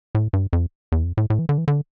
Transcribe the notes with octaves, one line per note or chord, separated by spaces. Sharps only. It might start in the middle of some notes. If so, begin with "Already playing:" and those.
A2
G2
F2
E2
F2
A2
A2
E3
D3
E3
D3